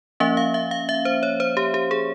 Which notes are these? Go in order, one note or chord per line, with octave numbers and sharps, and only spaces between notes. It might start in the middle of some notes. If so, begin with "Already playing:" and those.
F3 A#3 C#4 E5
F5
E5
F5
E5
C5
C#5
C5
G4
G4
G#4